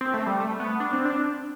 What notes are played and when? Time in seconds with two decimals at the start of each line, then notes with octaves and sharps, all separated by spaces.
0.01 C4
0.14 A3
0.26 G3
0.40 A3
0.60 B3
0.80 D4
0.93 C4
1.05 D4